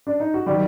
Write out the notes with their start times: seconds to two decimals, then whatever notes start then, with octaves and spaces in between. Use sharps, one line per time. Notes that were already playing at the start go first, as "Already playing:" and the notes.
0.07 D4
0.20 D#4
0.34 F#4
0.46 D#3 F#3 G3 G4